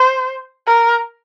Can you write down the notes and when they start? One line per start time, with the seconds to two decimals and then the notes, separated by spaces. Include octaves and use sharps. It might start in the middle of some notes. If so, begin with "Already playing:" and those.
Already playing: C5
0.67 A#4